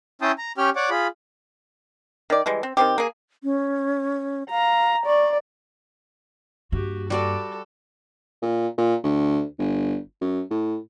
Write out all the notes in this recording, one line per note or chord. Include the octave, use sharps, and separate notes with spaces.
C#4 E4 G5 A5 C6 D#6
A#5
C#4 G4 C#5 G5 F6
C#5 D5 F#5 D6
F4 G#4 B5
D#3 D5
E3 G3 G#3
C4
D#3 C4 G4
A#3 G#4
C#4
F5 A#5
D5 C#6
G2 A#3 F#4 G4
G3 F#4 A4 D5
A#2
A#2
D2
G1
F#2
A2